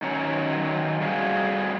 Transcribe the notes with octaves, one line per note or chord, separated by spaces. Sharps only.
D#3 F#3 C#4 C#5 A#5
F2 G3 F#4 G#4 F5